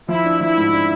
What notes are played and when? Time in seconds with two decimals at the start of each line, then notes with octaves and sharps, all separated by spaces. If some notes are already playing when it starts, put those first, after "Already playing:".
0.09 F3 E4
0.25 D4
0.41 F3 E4
0.57 G#2
0.73 D4